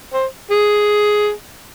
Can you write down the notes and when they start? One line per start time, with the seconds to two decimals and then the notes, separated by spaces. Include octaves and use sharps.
0.13 C5
0.51 G#4